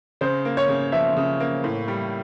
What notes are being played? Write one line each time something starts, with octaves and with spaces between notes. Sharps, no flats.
C#3 C5
A#3
C#5
C#3
F3 E5
C#3
A#3
A2
G3